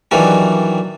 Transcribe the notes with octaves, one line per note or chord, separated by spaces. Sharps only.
D#3 E3 F#3 G3 D4